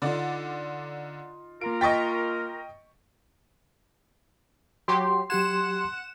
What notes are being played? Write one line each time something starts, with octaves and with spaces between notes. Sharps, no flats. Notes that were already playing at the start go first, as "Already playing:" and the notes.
D3 D#4 F4 D5
A#3 F4 A#4 D7
D#5 G5 C#6 A6 B6
F#3 G4 C6
F#3 G4 F#5 C6 G#6 E7